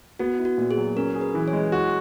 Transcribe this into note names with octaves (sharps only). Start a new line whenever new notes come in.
B3 F#4
E4
F#4
A#2
G#4
F#3
C#4 A#4
G#4
B4
E3
C#5
G#3
F#4